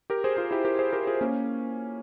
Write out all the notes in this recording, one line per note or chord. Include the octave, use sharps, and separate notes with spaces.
G4 A#4
G#4 C5
F4 G#4
E4 G4
G4 A#4
G#4 C5
G4 A#4
F4 G#4
A#3 C#4